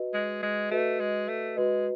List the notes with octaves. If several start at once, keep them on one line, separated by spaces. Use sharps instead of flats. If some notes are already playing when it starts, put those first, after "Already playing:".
Already playing: F#4 B4 D#5
G#3
G#3
A3 F#4 B4 D#5
G#3
A3
G#3 F#4 B4 D#5